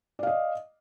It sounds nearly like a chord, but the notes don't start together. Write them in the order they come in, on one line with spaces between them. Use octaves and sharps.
D5 F5 D#5